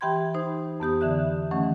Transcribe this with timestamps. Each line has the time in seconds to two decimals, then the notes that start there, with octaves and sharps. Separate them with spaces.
0.01 E3 G4 G5 B5 C6 G#6
0.34 D#4 C5
0.80 F2 B3 G4 D#6
1.01 D3 E3 E5 F#6
1.51 D#3 E3 F#3 A3 C#4